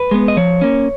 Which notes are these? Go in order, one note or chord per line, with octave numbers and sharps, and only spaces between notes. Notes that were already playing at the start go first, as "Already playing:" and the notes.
Already playing: B4
G#3 B3
D#5
F3 C#5
A#3 C#4